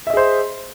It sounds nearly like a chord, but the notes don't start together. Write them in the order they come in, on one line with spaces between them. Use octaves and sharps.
E5 D#5 G#4 C5